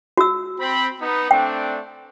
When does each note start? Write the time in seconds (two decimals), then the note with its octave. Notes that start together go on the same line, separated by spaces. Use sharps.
0.17 F#4 E6
0.59 C4 B5
1.00 B3 D#4
1.31 A3 C4 D4 G5